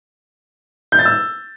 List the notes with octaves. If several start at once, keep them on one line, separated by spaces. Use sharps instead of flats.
G6
A6
E6